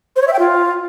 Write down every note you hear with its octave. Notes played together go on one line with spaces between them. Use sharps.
C5
C#5
E5
G5
F4